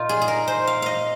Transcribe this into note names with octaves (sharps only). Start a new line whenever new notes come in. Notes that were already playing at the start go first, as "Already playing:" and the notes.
Already playing: A#2 A#3 D#4 F4
G#4
G#4
A#4
C5
F5
D#5 F5